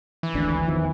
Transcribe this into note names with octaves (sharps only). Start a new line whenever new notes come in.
E3
G#1 D2 D4
E2 D#3 F3